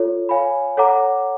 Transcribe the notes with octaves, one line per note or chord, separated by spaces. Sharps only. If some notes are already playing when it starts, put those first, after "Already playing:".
Already playing: F4 A4 C#5
C#5 F5 G#5 B5
A4 C#5 F#5 A#5 D6